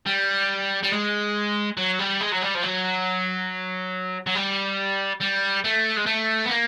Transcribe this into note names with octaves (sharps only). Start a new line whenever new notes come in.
G3
G3
G#3
F#3
G3
G#3
F#3
G3
F3
F#3
F#3
G3
G3
A3
G#3
A3
B3
A#3